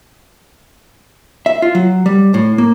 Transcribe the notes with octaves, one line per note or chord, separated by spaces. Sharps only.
E5
F4
F#3
G3
A2
A#3